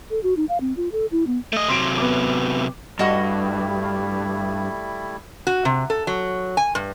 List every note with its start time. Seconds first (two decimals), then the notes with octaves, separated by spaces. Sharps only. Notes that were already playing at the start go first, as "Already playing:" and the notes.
0.11 A4
0.23 F#4
0.37 D#4
0.49 F5
0.61 C4
0.77 F4
0.92 A4
1.12 E4
1.27 B3
1.53 A3 D#5
1.68 C3 F#3 C6 D7
1.98 B3 D6
2.99 G2 G3 A3 E4 F#4 D#5 F#5
5.47 F#4
5.65 C3
5.90 A4
6.07 F#3
6.57 G#5
6.75 G2